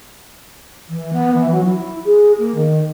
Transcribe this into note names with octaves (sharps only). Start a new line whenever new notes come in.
E3
B3
E3
F#3
E4
G#4
A#3
D#3